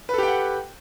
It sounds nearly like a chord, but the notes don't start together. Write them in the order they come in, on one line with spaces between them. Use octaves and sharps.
B4 A4 G4 G5 F#5